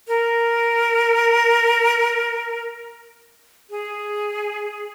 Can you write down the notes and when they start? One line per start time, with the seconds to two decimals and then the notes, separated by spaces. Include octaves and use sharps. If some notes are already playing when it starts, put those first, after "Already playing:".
0.08 A#4
3.70 G#4